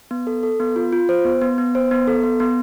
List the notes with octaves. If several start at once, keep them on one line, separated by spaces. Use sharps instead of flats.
B3
A4
A4
B3
F4
F4
C5
B3
B3
B3
C5
B3
A4
B3
B3